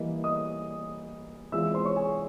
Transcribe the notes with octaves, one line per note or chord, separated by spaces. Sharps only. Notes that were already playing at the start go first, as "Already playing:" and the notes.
Already playing: E3 G3 A#3 D#5
D#5 D#6
E3 G#3 C4 F4 E5 E6
C5 C6
C#5 C#6
G#4 G#5